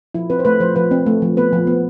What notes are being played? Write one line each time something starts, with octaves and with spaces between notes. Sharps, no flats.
F3 E4
C4 B4
C5
A3 B4
F3 C5
F3 B4
C4
A3
F3
B3 B4
F3
B3